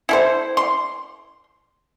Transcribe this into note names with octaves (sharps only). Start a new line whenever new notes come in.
E4 A4 C5
C6